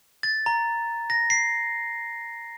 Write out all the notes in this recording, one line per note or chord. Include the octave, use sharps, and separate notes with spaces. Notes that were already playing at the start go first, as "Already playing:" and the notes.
A6
A#5
A#6
C7